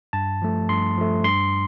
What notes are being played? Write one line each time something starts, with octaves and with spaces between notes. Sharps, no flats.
G2 A5
F3 A3
G2 C6
F3 A3
G2 C6